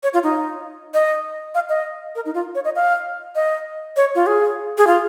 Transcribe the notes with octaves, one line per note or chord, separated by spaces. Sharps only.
C#5
F4
D#4
D#5
F5
D#5
A#4
D#4
F4
C#5
D#5
F5
D#5
C#5
F4
G#4
G#4
F4